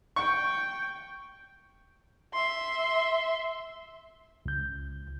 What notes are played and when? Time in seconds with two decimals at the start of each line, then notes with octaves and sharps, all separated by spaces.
0.16 G5 C#6
2.34 E5 C6
4.46 C#2 G6